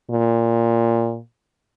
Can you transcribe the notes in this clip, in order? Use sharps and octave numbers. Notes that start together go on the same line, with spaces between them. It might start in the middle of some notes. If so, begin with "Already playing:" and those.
A#2